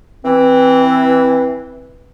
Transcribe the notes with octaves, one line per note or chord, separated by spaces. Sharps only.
E3 C4